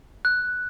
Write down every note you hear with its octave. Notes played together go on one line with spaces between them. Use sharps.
F#6